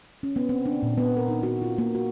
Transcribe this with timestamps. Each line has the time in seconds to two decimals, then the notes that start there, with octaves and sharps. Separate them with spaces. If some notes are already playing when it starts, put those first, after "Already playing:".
0.23 C#4
0.36 B3
0.49 C4
0.66 D4
0.83 A#2
0.98 B3
1.17 A#4
1.28 D#4
1.43 F#4
1.62 F4
1.78 A#3
1.95 F#4